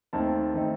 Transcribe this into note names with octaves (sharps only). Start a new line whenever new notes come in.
D#2 D#3 A3 C4 D#4 A5
D#3 A3 C4 D#4